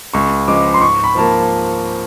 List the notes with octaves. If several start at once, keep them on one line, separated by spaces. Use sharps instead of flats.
C#2 C#6
C#3 F3 G#3 D6
C6
G#2 C#6
B5
F3 A#3 A5